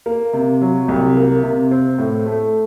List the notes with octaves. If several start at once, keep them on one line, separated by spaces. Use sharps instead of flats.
A#3
C3
F#3
C2
A#3
C3
C4
A2
A3